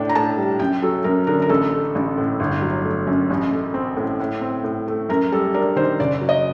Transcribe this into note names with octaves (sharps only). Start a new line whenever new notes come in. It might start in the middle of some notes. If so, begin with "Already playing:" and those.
Already playing: A2 D4 G5
A#5
A2 A5
G3
F#2 G5
F#3 A4
F#2 A#4
D3 A#4
A#4
A1 A4
A3
A1
A2
G1
F#3
A3
F#2
A1
A3
C4
A2
A2
C4
A2
A3
F#2 A#4
G3 A4
D4 A#4
D#3 C5
F#1 D5
F#3
D#5